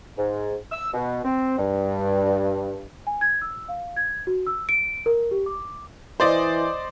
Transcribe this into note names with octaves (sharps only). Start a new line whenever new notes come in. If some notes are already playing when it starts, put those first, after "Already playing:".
G#2
E6
B2
C4
G2
G#5
G#6
E6
F5
G#6
F#4
E6
D7
A#4
G4
D6
E3 C5 D5 D#5